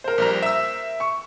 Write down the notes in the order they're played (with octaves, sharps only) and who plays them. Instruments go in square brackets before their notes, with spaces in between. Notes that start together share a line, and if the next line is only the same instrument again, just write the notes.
[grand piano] A#4 C5
[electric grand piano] A#1 G3 A#5
E5 E6
[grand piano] C#6